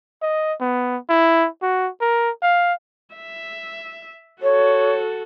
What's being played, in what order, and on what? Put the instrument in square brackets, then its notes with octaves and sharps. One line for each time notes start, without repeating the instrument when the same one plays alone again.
[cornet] D#5
B3
E4
F#4
A#4
F5
[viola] E5
[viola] F#4 A4 [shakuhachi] C#5